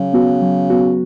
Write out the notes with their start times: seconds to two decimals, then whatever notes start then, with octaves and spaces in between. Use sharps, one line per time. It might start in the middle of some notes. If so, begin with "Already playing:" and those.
Already playing: C#3 F#3
0.13 B3 F#4
0.42 F#3
0.70 B3 F#4